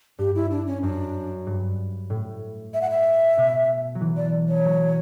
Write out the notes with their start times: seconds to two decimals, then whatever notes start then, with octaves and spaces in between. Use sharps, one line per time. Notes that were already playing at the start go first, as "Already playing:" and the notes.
0.19 G2 G4
0.35 E4
0.51 D4
0.67 C#4
0.83 F#2 D4
1.47 G2
2.10 A2
2.74 E5
2.81 F#5
2.90 E5
3.37 B2
3.95 F#3
4.01 E3
4.17 D5
4.49 C#5
4.65 F#3